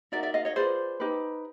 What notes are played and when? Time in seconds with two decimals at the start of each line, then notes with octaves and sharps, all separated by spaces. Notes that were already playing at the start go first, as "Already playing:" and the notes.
0.12 D#4 F#4 A#4 D5 E5
0.23 D5 E5
0.34 D#5 F5
0.45 C#5 D#5
0.56 F4 G#4 B4 C5 D5
1.00 D#4 G4 B4